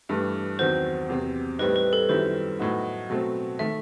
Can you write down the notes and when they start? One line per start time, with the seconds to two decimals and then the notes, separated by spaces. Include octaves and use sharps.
0.09 G2 E3 A3
0.59 E2 D#3 F#3 C4 F#4 C5
1.09 E2 C3 F#3 C4
1.59 A2 G3 C4 D#4 B4
1.76 B4
1.93 A4
2.09 F#2 D#3 G3 C4 E4 C5
2.59 A2 F#3 B3 D#4 F#4
3.10 B2 F#3 A3 C4
3.59 D#3 A3 E5